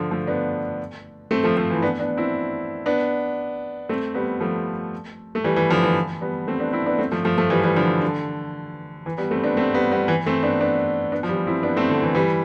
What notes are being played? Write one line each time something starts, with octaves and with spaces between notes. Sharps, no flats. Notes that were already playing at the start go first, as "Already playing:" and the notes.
Already playing: D3 F3
F3 A3
B3 D4
A3 C4
F3 A3
F3 A3
E3
E4
B3 D4
B3 D4
C4 E4
B3 D4
A3 C4
G3 B3
F3 A3
A3
E3 G3
E3
D3 F3
E3
G3 B3
A3 C4
B3 D4
C4 E4
B3 D4
A3 C4
F3 A3
F3 A3
F3 A3
E3 G3
E3 G3
D3 F3
D3
E3
G3 B3
A3 C4
B3 D4
A3 C4
G3 B3
G3 B3
E3
A3 C4
B3 D4
B3 D4
B3 D4
F3
E3 G3
C4 E4
B3 D4
A3 C4
D3
E3
E3 G3